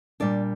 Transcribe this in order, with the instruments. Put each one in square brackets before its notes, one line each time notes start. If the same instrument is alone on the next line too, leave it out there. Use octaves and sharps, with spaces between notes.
[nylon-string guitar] A#2 G3 D4 D5